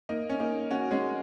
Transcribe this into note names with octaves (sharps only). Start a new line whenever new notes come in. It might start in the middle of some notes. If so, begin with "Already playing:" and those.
A#3 D#4
C#4
A#3 D#4
C#4 F#4
G#3 C#4